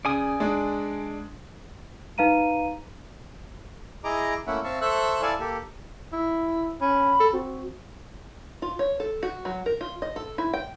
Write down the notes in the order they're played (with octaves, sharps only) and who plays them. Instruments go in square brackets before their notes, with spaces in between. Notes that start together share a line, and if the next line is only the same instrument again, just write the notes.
[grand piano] C#3 [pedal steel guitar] D5 G#5 D#6
[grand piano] G#3 D4
[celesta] D#4 B4 F5 A#5 D#7
[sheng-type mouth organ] E4 G#4 D#5 A#5 D6
A3 A#3 C#4 E4 E5 F#5
C4 E5 F5 A5 C#6
A4 C5 E5 C#6 E6 F#6
E4 A4 D5 F5 G#5 A5
A#3 G4 A4
[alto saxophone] E4
[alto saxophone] C#4 [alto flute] B5
[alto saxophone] A4
[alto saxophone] C4 [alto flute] F#4
[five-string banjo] F4
C#5
A4
F#4
F#3
A#4
F4
D#5
A4
E4
G5